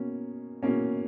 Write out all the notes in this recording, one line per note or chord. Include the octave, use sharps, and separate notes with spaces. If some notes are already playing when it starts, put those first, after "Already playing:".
Already playing: B2 A#3 C#4
B2 A#3 C#4